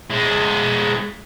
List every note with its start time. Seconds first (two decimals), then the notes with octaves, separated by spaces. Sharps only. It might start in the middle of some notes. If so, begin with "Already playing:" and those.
0.10 G#3 E4